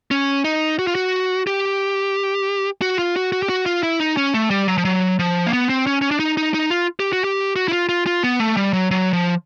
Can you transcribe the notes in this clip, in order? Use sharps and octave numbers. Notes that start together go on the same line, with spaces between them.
C#4
D#4
F#4
F4
F#4
G4
F#4
F4
F#4
F#4
G4
F#4
F4
E4
D#4
C#4
A3
G3
F#3
F3
F#3
F3
A#3
B3
C4
C#4
C#4
D4
D#4
D#4
D#4
F4
G4
F#4
G4
F#4
E4
F4
F4
F4
B3
A3
G3
F#3
F#3
F3